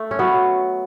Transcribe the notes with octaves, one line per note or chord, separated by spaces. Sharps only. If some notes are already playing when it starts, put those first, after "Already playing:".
Already playing: A3
C#4
F#3 B3